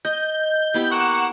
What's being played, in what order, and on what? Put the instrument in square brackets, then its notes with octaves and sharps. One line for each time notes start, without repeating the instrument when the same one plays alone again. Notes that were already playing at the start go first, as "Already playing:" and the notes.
[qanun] D#5 [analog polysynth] G6
[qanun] B3 E4 G4
[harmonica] A#3 C#6 [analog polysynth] F#5 E7